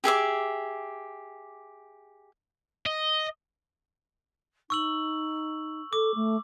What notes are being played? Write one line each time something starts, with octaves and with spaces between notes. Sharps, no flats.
G4 G#4 E5 D6
D#5
D#4 C#6 E6 F#7
A4 D6
A3